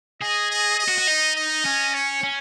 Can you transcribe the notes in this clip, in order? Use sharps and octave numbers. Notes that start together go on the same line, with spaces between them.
G#4 D#5
D#5
D#5
F#4
F#4
D#4
D#5
C#4
C#5
C#4